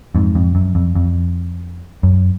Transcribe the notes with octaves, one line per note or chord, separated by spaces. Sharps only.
F2 G#2
F2
F#2
F2
F2
F#2